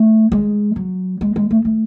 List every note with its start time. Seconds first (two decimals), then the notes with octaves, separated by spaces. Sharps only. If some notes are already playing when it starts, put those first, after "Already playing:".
Already playing: A3
0.32 G#3
0.76 F#3
1.21 G#3
1.36 G#3
1.51 A3
1.65 A3